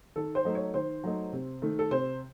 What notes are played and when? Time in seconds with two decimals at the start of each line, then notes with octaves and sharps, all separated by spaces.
0.16 D#3 A4
0.35 C5
0.45 F#3 A3 D#4
0.55 C#5
0.74 D#3 C5
1.04 F#3 A3 D#4
1.33 C3
1.62 D#3 A3
1.79 A4
1.91 C3 C5